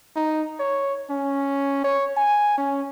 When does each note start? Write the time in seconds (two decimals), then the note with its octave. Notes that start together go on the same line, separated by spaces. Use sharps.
0.16 D#4
0.60 C#5
1.10 C#4
1.84 C#5
2.17 G#5
2.57 C#4